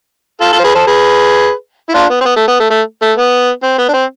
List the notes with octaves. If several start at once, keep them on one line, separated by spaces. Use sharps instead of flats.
F4 A4
F4 A4
C5
G#4 B4
A4 C5
G#4 B4
E4
D4 F4
B3
C4
B3
A3
B3
A3
A3
A3
B3
C4
B3
D4
C4